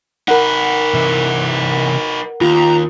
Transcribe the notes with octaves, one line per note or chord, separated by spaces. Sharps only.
D#4 A#4 B4 F#5
C3 E3
D#2 F4 A#5